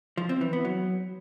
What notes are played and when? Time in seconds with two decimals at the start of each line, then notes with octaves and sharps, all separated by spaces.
0.17 F3
0.29 C4
0.41 E3
0.53 B3
0.65 F#3